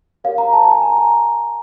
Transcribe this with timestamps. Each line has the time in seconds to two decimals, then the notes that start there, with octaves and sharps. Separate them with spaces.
0.24 G4 A#4 C#5 F5
0.38 A#5
0.53 A5
0.64 A5
0.68 G#5
0.82 A#5
0.98 A#5